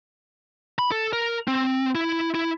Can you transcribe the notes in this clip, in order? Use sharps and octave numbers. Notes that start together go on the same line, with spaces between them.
B5
A4
A#4
C4
E4
E4